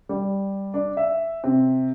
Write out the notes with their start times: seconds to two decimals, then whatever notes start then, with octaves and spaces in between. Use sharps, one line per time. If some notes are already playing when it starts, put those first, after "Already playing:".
0.09 G3
0.74 D4
0.97 E5
1.44 C3